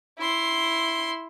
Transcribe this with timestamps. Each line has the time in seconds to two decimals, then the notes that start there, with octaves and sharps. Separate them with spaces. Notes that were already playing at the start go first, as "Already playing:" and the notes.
0.19 E4 C6